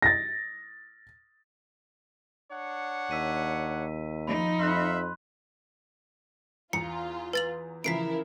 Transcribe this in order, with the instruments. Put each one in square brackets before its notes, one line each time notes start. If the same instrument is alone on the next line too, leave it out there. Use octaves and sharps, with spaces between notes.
[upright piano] A6 A#6
[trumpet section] D4 C#5 F#5
[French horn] D#2 [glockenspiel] E6 B6 D#7
[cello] F3 D#4 [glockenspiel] B5
[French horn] F2 [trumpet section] E5 F5 B5 [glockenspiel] C6 F#6
[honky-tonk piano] E2 A#5 [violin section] F4 [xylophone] C#7
[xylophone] B4 A6 F#7
[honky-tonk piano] C#3 E3 F3 [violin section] E4 A#4 [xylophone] B6 C7 D7